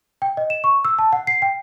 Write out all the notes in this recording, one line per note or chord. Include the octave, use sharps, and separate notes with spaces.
G5
D#5
E7
C#6
E6
A5
F#5
C7
G5